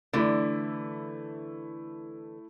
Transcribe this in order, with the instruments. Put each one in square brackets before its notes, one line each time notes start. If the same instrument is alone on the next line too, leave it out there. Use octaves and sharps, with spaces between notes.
[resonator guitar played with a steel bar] D3 E3 [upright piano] A3 E4